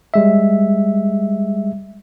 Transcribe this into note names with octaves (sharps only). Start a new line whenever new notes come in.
G3 G#3 E5